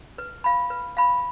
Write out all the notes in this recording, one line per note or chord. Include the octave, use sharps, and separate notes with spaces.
B4
F5 B5
B4
F5 B5